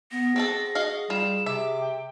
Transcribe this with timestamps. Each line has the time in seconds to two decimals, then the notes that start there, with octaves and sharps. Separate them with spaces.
0.11 B3 A#6
0.36 C4 F#4 G#4 A4
0.75 F#4 D#5 F5
1.10 G3 F4 E7
1.46 C3 E5 D6
1.81 G5